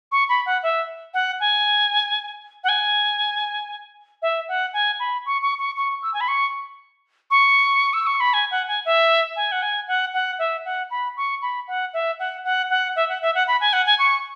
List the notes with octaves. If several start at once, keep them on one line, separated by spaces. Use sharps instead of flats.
C#6
B5
F#5
E5
F#5
G#5
F#5
G#5
E5
F#5
G#5
B5
C#6
C#6
C#6
C#6
E6
G#5
B5
C#6
C#6
E6
C#6
B5
G#5
F#5
G#5
E5
G#5
F#5
G#5
F#5
F#5
E5
F#5
B5
C#6
B5
F#5
E5
F#5
F#5
F#5
E5
F#5
E5
F#5
B5
G#5
F#5
G#5
C#6